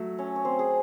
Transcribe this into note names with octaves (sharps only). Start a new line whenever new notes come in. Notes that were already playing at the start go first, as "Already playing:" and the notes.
Already playing: F#3 A3
C#4 C#5
C#5
C4 C5
G#4